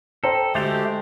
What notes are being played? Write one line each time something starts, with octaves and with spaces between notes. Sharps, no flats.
A4 C5 G5 A#5
D2 G#3 A3 G4 C5 E5 A6 F7